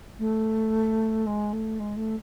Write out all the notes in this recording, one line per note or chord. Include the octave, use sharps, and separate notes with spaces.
A3
G#3
A3
G#3
A3